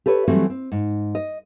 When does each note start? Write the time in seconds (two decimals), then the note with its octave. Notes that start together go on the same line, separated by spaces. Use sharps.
0.06 G4 A4 B4 C#5
0.28 E3 F#3 G3 A3 C4 F#4
0.50 C4
0.72 G#2
1.15 D#5